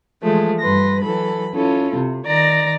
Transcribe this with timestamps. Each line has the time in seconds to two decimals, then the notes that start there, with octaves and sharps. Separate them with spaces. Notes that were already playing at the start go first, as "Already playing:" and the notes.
0.22 E3 F3 G#3 A3
0.60 G2 B4 C6 A#6
1.01 E3 F#3 A4 B5
1.54 C#4 E4 F4 A4
1.96 C3
2.25 D#3 D5 A#5 A#6